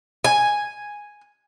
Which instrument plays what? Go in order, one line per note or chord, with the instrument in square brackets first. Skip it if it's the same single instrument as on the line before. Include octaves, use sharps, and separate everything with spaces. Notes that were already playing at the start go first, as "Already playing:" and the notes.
[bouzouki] G#5